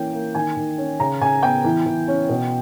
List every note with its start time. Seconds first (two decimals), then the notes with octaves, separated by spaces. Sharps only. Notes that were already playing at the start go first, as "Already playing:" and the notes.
Already playing: E3 A#3 C#4 G5
0.13 A#3
0.35 D#3 G#5
0.57 D#3
0.78 C#4
1.00 C#3 A#5
1.21 C#3 G#5
1.43 B3 G5
1.64 E3
1.86 E3
2.08 C#4
2.29 B2